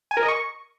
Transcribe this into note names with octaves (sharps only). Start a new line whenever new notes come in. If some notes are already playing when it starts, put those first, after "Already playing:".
G#5
A#4
D#5
C#6